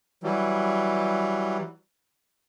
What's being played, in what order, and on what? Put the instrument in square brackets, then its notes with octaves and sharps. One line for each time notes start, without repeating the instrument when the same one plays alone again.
[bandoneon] E3 F#3 G3